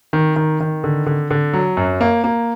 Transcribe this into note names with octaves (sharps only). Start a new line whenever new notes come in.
D#3
D#3
D#3
D3
D3
D3
F#3
F#2
A#3
A#3